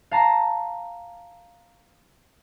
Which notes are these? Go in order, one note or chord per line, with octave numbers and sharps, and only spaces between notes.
F5 A5 A#5